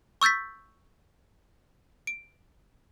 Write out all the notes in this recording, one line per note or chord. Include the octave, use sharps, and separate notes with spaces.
C#6 E6 G6 A6 B6
D7